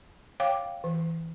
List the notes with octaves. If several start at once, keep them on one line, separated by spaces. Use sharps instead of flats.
C#5 F5 G5 D6
E3